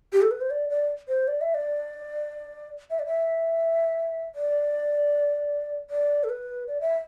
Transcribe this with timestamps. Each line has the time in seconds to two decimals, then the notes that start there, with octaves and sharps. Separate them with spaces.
0.13 G4
0.22 A4
0.31 B4
0.41 C5
0.50 D5
0.70 D5
1.08 C5
1.28 D5
1.41 E5
1.54 D5
2.90 E5
2.99 D5
3.07 E5
4.35 D5
5.90 D5
6.24 A4
6.29 B4
6.68 D5
6.81 E5